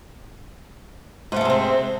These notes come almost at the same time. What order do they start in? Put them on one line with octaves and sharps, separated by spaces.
G#2 A3 G#3 C3 C4